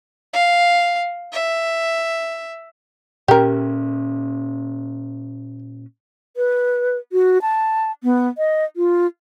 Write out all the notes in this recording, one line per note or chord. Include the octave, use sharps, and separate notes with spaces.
F5
E5
A#2 C#4 G4 A#4
B4
F#4
A5
B3
D#5
F4